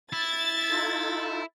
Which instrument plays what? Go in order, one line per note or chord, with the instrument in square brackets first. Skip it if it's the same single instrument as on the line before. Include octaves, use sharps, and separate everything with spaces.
[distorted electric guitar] E4 [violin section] A6
[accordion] D#4 F4 A4